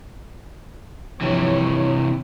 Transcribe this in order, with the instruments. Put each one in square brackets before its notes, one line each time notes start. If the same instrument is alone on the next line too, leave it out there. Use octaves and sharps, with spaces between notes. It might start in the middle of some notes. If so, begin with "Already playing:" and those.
[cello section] G2 F3 C#5 [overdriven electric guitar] C3 E3